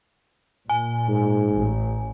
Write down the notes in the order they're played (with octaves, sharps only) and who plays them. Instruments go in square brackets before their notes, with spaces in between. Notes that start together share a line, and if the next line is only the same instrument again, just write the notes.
[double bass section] A#2 [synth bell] G#5
[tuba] G#2
[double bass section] A1